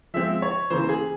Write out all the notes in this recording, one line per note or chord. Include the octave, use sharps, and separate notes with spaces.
F3 G#3 C4 E5
C#5
C#3 E3 A#3 C5
G#4